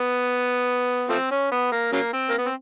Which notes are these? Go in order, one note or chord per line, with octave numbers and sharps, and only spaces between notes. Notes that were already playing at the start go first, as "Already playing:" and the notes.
Already playing: B3
F3 A3 C4
C#4
B3
A#3
C#3 F#3 A#3
C4
A#3
B3
C4